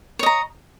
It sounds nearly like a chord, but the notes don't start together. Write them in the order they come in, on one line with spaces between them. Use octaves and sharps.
C#5 D#5 A#5